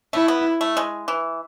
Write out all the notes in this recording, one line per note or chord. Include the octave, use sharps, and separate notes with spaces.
A3 E4
B3
A3
G#3
E3